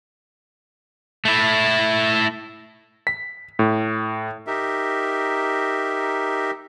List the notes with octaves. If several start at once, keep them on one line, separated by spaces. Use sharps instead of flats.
A3 E4
B6
A2
D#4 G4 A#4 E5